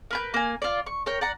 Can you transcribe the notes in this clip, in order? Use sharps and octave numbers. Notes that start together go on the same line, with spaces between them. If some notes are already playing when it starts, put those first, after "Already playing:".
A#4 B4 G6
A#3 G#5
F4 D5
C#6
A#4 C#5 G5
D5 F#5 A#5